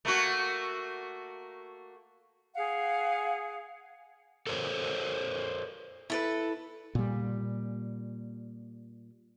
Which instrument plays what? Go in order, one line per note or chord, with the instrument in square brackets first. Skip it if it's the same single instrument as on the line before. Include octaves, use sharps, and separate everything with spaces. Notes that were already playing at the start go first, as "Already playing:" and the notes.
[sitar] A3 A#3 F#4
[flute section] G#4 F5 F#5
[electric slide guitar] A4 A#4 C5 C#5
[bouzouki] E4 A4 B4
[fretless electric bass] A#2 G3